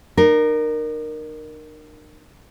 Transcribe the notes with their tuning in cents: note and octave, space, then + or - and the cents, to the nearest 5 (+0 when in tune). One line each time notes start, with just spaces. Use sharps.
D#4 -45 A#4 +0